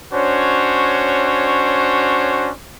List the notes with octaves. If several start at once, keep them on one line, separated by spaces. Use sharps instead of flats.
C#4 D4 F#4 C5 C#5